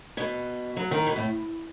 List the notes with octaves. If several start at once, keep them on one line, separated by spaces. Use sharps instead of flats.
B2
F#3
D#3
B2
A2